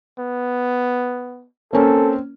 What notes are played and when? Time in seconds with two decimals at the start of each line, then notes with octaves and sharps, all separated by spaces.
0.19 B3
1.73 A#3 C4 C#4 A4